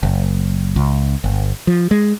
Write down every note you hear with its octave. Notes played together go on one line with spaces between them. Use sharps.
F#1
C#2
G1
F3
G#3